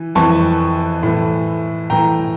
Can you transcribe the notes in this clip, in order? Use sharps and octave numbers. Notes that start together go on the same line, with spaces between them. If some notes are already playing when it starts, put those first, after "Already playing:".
Already playing: E3
F2 E3 A5 C#6
A2 E3
A2 E3 G5 A#5